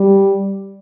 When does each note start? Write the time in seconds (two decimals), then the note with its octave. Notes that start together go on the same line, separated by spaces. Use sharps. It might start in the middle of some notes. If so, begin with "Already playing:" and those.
Already playing: G3